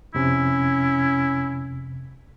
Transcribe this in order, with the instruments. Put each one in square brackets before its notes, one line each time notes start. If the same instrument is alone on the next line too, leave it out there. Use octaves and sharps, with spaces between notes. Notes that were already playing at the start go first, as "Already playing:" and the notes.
[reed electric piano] F2 C3 [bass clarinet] C#4 [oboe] E4